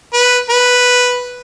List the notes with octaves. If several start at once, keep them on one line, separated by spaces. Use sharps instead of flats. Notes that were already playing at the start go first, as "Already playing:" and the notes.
B4
B4